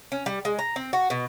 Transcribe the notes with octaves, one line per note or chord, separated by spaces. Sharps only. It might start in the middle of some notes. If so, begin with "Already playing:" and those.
C#4
G3
G#3
A#5
C4
F#4
B2